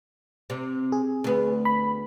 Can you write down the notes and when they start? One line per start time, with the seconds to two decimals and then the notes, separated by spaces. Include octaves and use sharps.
0.50 C3
0.92 G#4
1.24 D2 B3
1.65 B5